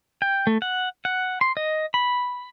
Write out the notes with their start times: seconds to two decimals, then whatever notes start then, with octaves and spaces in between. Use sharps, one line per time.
0.22 G5
0.47 A3
0.62 F#5
1.05 F#5
1.41 C6
1.57 D#5
1.94 B5